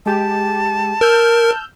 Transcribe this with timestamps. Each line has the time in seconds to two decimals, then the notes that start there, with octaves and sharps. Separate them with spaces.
0.06 G#3 G4 A5
1.01 A#4 E6 F6 G6